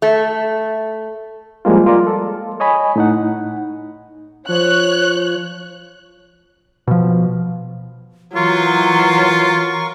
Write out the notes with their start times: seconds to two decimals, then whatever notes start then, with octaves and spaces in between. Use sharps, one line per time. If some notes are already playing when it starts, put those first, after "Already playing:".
0.02 A3
1.65 F3 G3 G#3 A#3 F4
1.87 F4 A#4 D5
2.07 A4
2.60 C#5 D#5 G#5 B5
2.96 A2 D#4 F#5
4.48 F3 C#5 F#6
6.87 B2 F3
8.36 E3 F#3 F4 A#4 C#6